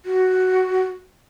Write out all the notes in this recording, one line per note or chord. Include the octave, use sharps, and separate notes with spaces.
F#4